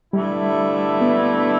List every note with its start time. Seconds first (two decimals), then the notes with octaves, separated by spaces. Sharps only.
0.13 G2 D3 G3 A3 E4
1.01 B3